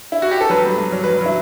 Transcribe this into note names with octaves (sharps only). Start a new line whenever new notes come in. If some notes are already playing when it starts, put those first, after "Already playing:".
E4
F#4
G4
A4
F#3 B4
G2
G2
F#3
F#3 B4
F#3 E4